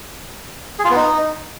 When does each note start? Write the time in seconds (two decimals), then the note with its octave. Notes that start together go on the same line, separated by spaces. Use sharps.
0.79 G#4
0.85 F4
0.90 B3
0.96 D#4